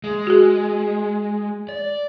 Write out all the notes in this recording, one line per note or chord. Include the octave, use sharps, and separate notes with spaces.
G#3
F#4 G#4
D5